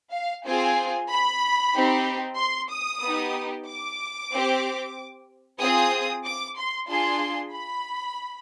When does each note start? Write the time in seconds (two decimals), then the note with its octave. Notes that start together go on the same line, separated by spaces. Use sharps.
0.13 F5
0.46 C4 F4 G#4 G#5
1.10 B5
1.75 C4 D#4 G4
2.39 C6
2.71 D#6
3.03 B3 D#4 G4
3.67 D6
4.32 C4 G4
5.60 C4 F4 G#4 D#6
6.24 D6
6.57 C6
6.88 D4 F4 G#4 C6
7.53 B5